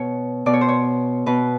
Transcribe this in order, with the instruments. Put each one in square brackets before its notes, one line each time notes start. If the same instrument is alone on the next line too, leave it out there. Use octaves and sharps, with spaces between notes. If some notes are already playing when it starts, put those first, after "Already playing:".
Already playing: [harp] B2 C#5
B2 D5
C#5
C5
C#5
B2 B4